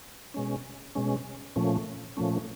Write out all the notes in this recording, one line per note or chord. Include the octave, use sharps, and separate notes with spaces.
B2 G#3 C#4
B2 G#3 C#4
A#2 F3 A3 C#4
A#2 F3 A3 C#4